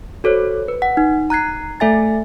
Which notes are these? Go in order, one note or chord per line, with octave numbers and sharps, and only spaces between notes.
F#4 A4 C5 C#5
B4
F#5
D#4
A#5 F#6 G#6 C7
A3 A4 E5 G#5 A6